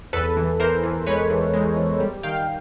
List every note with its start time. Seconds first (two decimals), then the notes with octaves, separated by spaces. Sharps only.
0.13 E2 A4 B4
0.37 E3
0.60 E3 A#4 C5
0.83 E3
1.07 G#3 B4 C#5
1.30 E3
1.54 G#3
1.76 E3
2.00 G3
2.23 D#3 F5 G5